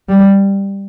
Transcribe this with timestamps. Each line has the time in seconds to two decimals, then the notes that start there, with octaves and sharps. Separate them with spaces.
0.09 G3